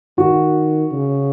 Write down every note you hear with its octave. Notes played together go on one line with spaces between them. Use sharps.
D#3 F#4
C#3